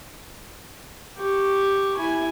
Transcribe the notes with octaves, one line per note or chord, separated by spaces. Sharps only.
G4 C#6
E4 G#5